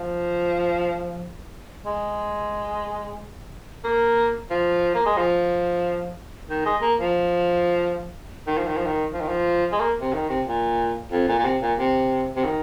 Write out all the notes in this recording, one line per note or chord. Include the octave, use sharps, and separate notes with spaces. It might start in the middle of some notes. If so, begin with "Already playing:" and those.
Already playing: F3
G#3
A#3
F3
A#3
G#3
F3
D#3
G#3
A#3
F3
D#3
F3
D#3
F3
D#3
F3
D#3
F3
G#3
A#3
C3
D#3
C3
A#2
F2
A#2
A#2
C3
A#2
C3
C3
D#3